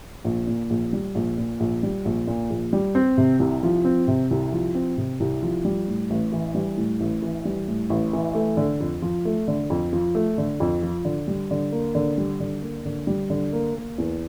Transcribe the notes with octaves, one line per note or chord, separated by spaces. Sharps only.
A#1
A#2
A#1
G3
A#1
A#2
A#1
G3
A#1
A#2
A#1
G3
C4
C3
C2
F3
C4
C3
C2
F3
C4
C3
C2
F3
G3
A2
A1
E3
G3
A2
A1
E3
G3
A2
A1
E3
A3
D3
F2
F3
A3
D3
F2
F3
A3
D3
F2
F3
D3
G3
D3
A#3
D3
G3
D3
A#3
D3
G3
D3
A#3
A#3
E2